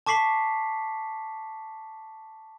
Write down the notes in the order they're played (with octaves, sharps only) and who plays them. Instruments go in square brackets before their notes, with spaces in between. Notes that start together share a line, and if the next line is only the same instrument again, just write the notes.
[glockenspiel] A5 C#6 D6 B6 C7 F#7